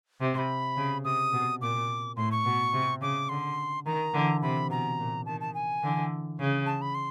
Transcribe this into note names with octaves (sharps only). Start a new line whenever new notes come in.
C3
C6
B5
C#3
C3 D#6
B2
A#2 D6
A2 C6
C#6
B2
C3
C#3 D6
D3 C6
D#3 A#5
D3 E3
C3 B5
B2 A#5
A#2
D#3 A5
A5
G#5
D3 E3
C#3
A5
B5
C6